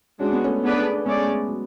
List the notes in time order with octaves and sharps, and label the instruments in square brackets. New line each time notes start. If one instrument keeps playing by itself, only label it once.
[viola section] G#3 D4 F#4 [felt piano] C#4
[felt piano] B3
A3 C#4
[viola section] B3 D4 G#4 B4 D5
[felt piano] G#3 B3 [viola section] A3 C#4 G#4 D5
[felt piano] G#3
F#3